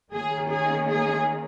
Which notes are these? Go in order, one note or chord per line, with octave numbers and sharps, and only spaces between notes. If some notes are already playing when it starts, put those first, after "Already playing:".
D#3 A#3 C#4 G#4
G#4
G#4